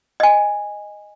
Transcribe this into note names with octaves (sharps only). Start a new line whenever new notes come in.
D#5 G#5